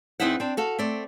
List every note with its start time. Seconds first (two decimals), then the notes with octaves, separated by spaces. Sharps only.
0.20 E2 C4 D#4 E4 E5 F#5
0.40 C4 D4
0.57 F#4 A4 F5
0.79 A3 C4 D5